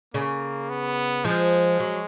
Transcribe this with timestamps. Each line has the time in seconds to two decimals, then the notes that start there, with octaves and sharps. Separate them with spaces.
0.14 C#3 A#3
0.69 B3
1.25 F3 G#3
1.80 F#3